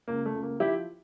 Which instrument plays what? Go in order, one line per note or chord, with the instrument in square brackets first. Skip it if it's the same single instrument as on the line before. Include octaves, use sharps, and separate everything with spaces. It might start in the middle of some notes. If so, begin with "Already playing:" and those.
[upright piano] C#2 A#3
A3
C#2
A#3
F3 E4 G4